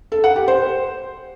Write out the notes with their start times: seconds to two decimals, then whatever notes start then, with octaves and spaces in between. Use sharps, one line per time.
0.12 A4
0.24 F#5
0.36 G4
0.48 C5